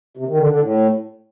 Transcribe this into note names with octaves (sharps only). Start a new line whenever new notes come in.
C3
D#3
D3
D3
A2